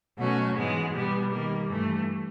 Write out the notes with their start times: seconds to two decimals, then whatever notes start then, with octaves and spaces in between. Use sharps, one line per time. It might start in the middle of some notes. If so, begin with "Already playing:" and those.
0.18 B2 F#3 A3 C#4 F#4
0.55 G#2 E3 G#3 B3
0.93 B2 G3 B3
1.30 D#3 G3 A#3
1.68 G2 E3 A3